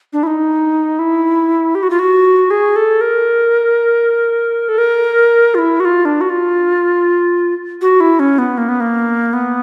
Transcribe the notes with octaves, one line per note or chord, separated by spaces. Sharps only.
D4
E4
D#4
E4
G4
F#4
F4
F#4
G#4
A4
A#4
A4
A#4
F4
E4
F#4
F4
D4
F#4
F4
F#4
E4
C#4
B3
A#3
B3
A#3
B3